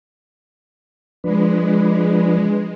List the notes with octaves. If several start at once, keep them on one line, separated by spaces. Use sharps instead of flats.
F3 G#3 D4 B4